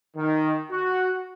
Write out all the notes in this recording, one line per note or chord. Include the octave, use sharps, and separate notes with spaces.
D#3
F#4